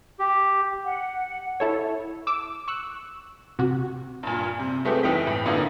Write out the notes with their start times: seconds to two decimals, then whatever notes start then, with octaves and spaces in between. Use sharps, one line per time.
0.19 G4
0.84 F#5
1.60 E4 A4 C#5
2.27 D6 E6
2.68 C#6 E6 F#6
3.59 C3 F#4
4.23 G2 A#2
4.59 C3
4.85 G#3 A3 B3 C4 G4
5.03 F#1 E3 D#4 E4 G5 B6
5.27 A2
5.45 F#2 D3 A#3 B3 D#4 E4